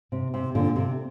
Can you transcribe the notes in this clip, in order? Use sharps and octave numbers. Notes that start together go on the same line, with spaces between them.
C3
C3
A#2 D3
C3